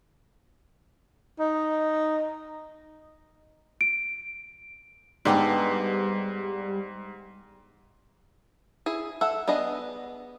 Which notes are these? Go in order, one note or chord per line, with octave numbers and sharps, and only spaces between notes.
D#4
D7
G#2 D3 G3 G#3 B3 D#4 G4 D5
E4 G#4
A4 E5 F#5
B3 D4 G#4 D#5